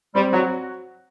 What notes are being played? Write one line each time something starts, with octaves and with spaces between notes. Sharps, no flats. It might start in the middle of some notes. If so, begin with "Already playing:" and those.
G3 C4
F#3 F#4